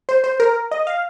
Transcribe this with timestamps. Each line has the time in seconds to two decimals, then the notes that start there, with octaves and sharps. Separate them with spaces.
0.09 C5
0.24 C5
0.40 A#4
0.71 D#5
0.87 F5